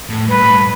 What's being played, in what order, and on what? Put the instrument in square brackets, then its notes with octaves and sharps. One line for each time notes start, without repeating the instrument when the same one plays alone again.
[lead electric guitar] A2
[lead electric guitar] G2 [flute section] B4
[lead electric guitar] A2
G2